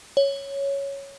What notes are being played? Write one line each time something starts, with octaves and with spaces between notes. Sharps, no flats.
C#5